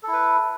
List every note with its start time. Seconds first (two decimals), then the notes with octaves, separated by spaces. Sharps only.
0.03 A4
0.08 E4
0.13 B4